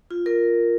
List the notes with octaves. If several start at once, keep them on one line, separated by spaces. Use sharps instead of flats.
F4
A#4